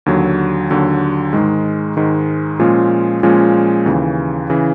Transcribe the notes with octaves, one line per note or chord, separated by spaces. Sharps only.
D#2 D3 F#3
D#2 D3 F#3
G#2 D#3 G#3
G#2 D#3 G#3
A#2 F3 G#3 C#4 F4
A#2 F3 G#3 C#4 F4
D#2 C#3 E3
C#3 E3